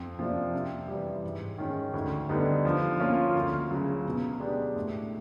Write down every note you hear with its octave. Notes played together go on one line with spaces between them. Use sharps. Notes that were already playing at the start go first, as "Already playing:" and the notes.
Already playing: F2
C3 F3 A#3 D4
C3
E3 G3
G#2
D#3 G#3 C#4
D2
D3 G3 B3 D#4
F3
A#3 C#4 F4
D2
C#3 F#3
B2
G#3 B3 D4 G4
A2